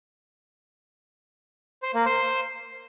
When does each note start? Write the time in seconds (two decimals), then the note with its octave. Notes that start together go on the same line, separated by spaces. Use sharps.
1.83 C5
1.94 A#3
2.06 C5